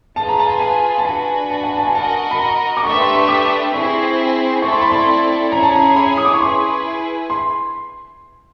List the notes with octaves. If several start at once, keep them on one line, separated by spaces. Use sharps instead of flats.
F4 G#4 B4 A5
A#5
A5
G#5
A5
D4 F#4 B4 G#5
A5
G#5
A5
G#5
F#4 A#4 D#5 A5
B5
A#5
D6
A3 D4 G4 B4 E5 C#6
C6
C#6
D6
C4 E4 G#4 C5 C#6
A3 C4 E4 A4 D5 C#6
C6
B5
C6
C#4 E4 G#4 C#5 A#5
A5
A#5
B5
D#6
D6
C#6
E4 G#4 B4 C6
C6